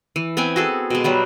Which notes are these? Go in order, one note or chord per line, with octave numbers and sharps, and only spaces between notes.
E3
B3 C4 G5 G#5
F#4 G#4 A4
B2 G#3
F#3 G3 B3